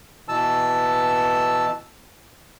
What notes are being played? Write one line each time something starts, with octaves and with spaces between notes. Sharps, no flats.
B2 E3 A5 E6